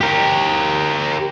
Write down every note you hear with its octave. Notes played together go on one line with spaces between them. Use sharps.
G4 A#4